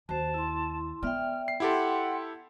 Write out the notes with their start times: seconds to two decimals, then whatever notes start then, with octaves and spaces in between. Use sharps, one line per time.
0.09 D#2 F#4 C5 A5
0.34 E4 C6
1.03 B3 D5 E5 G5 F6
1.48 C7
1.60 E4 G4 A4 F#5 G5 C6